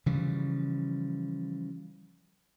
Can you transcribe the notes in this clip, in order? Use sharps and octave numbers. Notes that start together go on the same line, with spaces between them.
C#3 E3 F3 G3